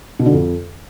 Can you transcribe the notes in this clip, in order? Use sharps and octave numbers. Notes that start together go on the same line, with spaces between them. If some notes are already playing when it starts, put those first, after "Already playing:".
B2
D3
F2